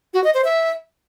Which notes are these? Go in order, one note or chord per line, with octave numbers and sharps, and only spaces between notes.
F#4
D#5
C5
E5